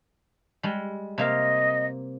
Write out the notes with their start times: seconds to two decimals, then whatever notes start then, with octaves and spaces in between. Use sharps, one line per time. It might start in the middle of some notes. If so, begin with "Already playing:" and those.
0.63 G3 G#3
1.18 C3 A#3 D#5 F5